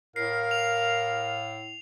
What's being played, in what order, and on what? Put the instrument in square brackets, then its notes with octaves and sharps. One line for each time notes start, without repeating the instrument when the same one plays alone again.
[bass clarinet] A2 [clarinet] A#4 [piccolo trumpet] F5 [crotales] C7
[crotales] F7